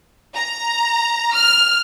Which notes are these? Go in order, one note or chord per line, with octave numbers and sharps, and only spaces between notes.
A#5
F6